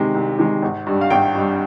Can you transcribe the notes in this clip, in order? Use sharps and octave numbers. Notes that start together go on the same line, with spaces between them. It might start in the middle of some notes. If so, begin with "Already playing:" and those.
Already playing: C2 C3 D#3 G#3
C2
C3 D#3 G#3
G#1
G2 G3
F5
G#1 G5
G2 G3